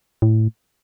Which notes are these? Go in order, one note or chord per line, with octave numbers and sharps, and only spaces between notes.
A2